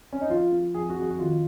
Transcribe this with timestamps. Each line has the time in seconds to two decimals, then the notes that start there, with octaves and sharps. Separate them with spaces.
0.13 C#4
0.21 D#4
0.30 F3 F4
0.52 F3
0.74 F2 G#4
0.90 F#4
0.98 F2 G#4
1.10 F#4
1.19 D#3 F4